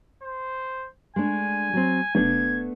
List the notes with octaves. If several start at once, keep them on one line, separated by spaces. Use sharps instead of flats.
C5
G#3 A3 D4 G#5
F#3 C4
F1 A3 B3 D4 G#6